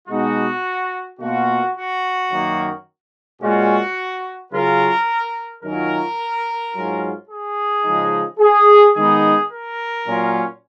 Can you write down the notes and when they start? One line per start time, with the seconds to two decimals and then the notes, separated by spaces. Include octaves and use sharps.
0.08 B2 G#3 B3 D#4 F#4
1.20 B2 A#3 F4 F#4
1.76 F#4
2.30 F#2 D#3 A#3
3.41 A#2 G#3 C#4 F4 F#4
4.52 C#3 F#3 C#4 F4 A#4
5.62 F#2 D#3 F#3 C#4 F4 A#4
6.74 G#2 F#3 C#4 F4
7.30 G#4
7.84 C#3 F3 G#3 D#4
8.39 G#4
8.95 D#3 G#3 B3 D#4 G#4
9.50 A#4
10.05 A#2 F#3 C#4 F4